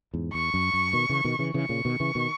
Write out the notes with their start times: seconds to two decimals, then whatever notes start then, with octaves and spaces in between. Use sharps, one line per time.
0.14 E2 G#2
0.33 E2 C#6
0.54 F#2
0.73 F#2
0.93 B2 D#3
1.09 C#3 E3
1.24 B2 D#3
1.39 C#3 E3
1.54 C#3 E3 C#6
1.69 A#2 C#3
1.85 B2 D#3
2.00 C#3 E3
2.15 B2 D#3